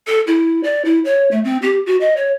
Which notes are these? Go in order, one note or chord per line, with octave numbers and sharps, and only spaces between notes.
A4
E4
D5
E4
C#5
A3
C4
G4
F#4
D#5
C#5